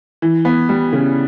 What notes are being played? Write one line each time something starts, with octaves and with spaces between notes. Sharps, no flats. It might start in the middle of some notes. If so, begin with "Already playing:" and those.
E3
B3
G3
C#3